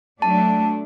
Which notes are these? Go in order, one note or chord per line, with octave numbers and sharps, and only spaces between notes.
F#3 A3 D4 A5